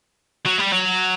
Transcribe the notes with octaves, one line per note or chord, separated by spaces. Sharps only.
F#3
G3
F#3